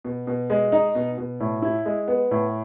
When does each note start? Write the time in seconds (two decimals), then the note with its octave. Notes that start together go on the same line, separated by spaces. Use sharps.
0.04 B2
0.27 B2
0.50 G#3
0.72 D#4
0.95 B2
1.18 B2
1.40 A2
1.62 E4
1.85 G#3
2.08 B3
2.31 A2